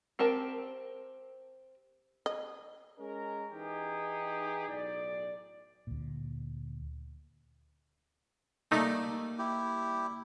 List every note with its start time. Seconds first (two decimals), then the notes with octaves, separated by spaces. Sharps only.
0.19 C4 G4 A#4 A5
2.26 D#5
2.99 G#3 C#4 A#4
3.53 E3 D#4 G4 G#4
4.68 B1 A2 D5
5.87 D2 A#2
8.71 G3 A3 A#3 D#4 D5
9.38 E4 G4